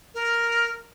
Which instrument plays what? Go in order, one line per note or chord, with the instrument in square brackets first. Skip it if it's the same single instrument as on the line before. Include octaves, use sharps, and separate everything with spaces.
[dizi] A#4